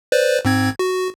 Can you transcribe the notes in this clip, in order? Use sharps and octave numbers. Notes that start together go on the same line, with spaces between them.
B4 C5 D5
G#2 C4 G#6
F#4